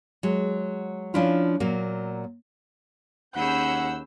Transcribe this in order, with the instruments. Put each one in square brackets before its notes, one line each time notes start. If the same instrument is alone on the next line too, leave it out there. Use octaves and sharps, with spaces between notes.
[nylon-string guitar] F#3 G#3
F3 C#4 D4 E4 F4
A#2 F#3 A#3
[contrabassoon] D#2 [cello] C#4 G#4 [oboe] F#5 [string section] B5 E6 G6